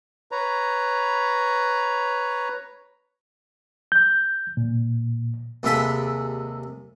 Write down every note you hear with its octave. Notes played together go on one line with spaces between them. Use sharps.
B4 C#5 A#5
G6
A#2
D#2 C3 G#3 A4 B5